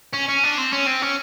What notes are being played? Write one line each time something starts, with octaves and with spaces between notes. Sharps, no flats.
C#4
C#4
D4
C4
C#4
C4
C#4